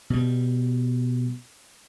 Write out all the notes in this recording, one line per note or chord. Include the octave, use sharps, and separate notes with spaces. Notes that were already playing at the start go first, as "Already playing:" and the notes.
B2 G3